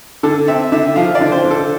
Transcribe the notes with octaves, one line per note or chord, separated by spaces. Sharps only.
D3 A4
C4 E5
D3 E5
F3 F5
D5
D3
C5
D3
A4